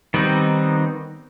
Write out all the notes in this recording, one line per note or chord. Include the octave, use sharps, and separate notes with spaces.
D#3 G3 B3 C4 D#4